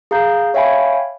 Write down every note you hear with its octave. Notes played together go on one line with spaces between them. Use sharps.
G#4 F5 A#5 G6
C#5 E5 F5 G5 G#5 B5